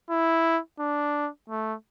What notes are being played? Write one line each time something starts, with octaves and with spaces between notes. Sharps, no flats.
E4
D4
A3